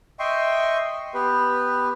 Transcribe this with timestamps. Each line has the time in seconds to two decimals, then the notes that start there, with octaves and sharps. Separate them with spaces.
0.19 D#5 E5 G5 C6 C#6
1.14 B3 G4 B4